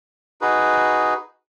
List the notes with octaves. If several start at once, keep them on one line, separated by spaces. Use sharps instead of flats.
D#4 F#4 G#4 B4